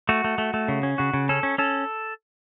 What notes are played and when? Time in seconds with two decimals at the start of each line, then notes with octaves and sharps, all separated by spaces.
0.09 A3 F#4
0.24 A3
0.38 A3
0.54 A3
0.68 C#3
0.83 C#4
0.98 C#3 F#4
1.14 C#3
1.29 C#4 A4
1.43 C#4
1.58 C#4 A4